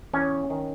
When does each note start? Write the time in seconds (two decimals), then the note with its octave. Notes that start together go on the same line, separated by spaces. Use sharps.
0.13 E2 C#4
0.50 D#3